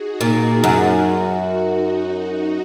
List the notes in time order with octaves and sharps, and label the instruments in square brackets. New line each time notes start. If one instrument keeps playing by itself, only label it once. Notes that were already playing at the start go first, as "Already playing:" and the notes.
Already playing: [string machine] D#4 F#4 G#4
[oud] A#2
F#2
[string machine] F#4
D#4
F#4
F#4